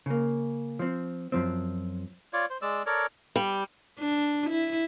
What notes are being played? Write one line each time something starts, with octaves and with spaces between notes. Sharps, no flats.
C#3 A#3
F3 C4
F#2 F3 C4
F4 C#5 D5
C5
G#3 D5 E6
A4 A#4 C#5 D5
G3
D4
E4